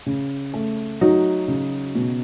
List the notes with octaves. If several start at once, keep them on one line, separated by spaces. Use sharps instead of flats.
C#3
A3
F#3 D#4 F#4
C#3
B2